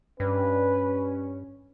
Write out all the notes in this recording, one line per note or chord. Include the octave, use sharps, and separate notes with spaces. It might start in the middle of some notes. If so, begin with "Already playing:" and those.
G2 C#4 B4